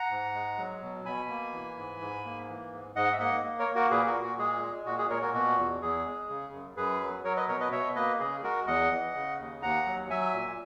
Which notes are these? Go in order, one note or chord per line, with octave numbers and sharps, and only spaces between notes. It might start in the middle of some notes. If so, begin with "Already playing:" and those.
Already playing: F#5 A#5
G#2
G#3
F#3
B2
B2 G#5 B5
A#3
E3
G#2
G#2
A#3
E3
G#2
G#2 D#5 F#5
E5
A#3 D#5 F#5
A#3
A#4 C#5
A#3
F#4 A#4
A#2 G#4 B4
F#4 A#4
A#2
F#4
G#3 G#4
G#3
A#2 F#4
G#4
A#2 A#4 C#5
F#4 A#4
B2 F#4
E2
E2 G#4
G#3
C#3
F#2
F#2 G#4 B4
F#3
F#3 A#4 C#5
B4 D#5
B2 A#4 C#5
B4 D#5
B2 C#5 E5
A#3 B4 D#5
C#3 G#4
G#3 F#4 A#4
E2 D#5 F#5
E3
C#3
D#2
D#2 F#5 A#5
F#3
F#3 E5 G#5
A#2